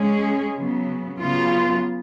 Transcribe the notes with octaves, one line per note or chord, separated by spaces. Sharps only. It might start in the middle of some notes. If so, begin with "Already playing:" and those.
Already playing: G#3 C#4 G#4
C#3 F#3 B3
C#3 F#3 B3 F4